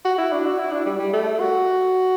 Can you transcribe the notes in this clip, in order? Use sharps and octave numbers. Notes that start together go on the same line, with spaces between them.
F#4
E4
D4
F#4
E4
D4
G3
G3
A3
F#4